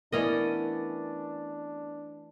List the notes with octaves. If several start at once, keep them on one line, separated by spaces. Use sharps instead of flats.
E3 A3 B3 C#4 D4 A#4 D5 D#5